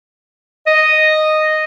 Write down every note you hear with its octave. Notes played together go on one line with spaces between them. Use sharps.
D#5